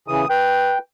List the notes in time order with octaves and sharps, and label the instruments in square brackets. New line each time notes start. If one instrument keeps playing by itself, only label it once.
[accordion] C#3 E3 [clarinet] D#6
[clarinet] B4 [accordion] G5